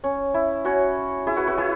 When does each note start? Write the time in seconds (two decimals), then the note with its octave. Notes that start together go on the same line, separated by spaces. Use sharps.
0.04 C#4
0.34 E4
0.65 C#4 F#4
1.26 E4 G#4
1.36 F#4 B4
1.47 F#4 B4
1.58 E4 G#4